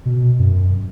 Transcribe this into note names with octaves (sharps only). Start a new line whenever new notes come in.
B2
F#2